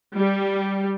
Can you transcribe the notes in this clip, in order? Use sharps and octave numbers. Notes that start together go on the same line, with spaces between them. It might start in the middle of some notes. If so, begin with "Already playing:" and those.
G3